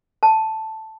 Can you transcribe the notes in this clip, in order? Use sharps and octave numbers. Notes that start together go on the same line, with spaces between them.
A5